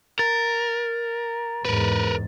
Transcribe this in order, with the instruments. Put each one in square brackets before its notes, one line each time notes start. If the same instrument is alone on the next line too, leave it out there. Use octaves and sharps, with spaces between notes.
[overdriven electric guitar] A#4 [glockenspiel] A6
[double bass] E2 G#2 [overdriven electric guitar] A#4 B4